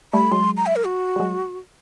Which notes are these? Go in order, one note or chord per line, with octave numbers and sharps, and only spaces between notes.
G3 A3 B5
F#3 G#3 C6
A#5
E5
A#4
F#4
G3
F#3 G#3